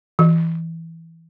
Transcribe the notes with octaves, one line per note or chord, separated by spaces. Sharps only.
E3